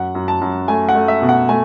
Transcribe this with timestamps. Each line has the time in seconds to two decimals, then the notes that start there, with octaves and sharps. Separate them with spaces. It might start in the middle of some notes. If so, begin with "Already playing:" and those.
Already playing: F#2 F#5
0.15 F#2
0.28 A5
0.41 F#2
0.68 A3 G#5
0.89 F#5
0.95 A3
1.08 E5
1.22 B2
1.29 F#5
1.49 A3 G#5